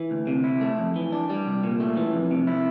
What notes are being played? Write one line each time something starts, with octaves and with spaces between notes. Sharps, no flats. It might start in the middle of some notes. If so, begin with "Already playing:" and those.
Already playing: E3
D2
C3
E4
A3
F2
E3
D4
G3
C2
A#2
A3
E3
F2
C3
E4